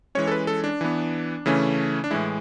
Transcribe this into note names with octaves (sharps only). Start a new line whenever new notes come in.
E3 G#3 C#4 C#5
A4
B4
A4
D4
E3 B3
C#3 E3 A3 C#4
D4
A2 E3 G#3 E4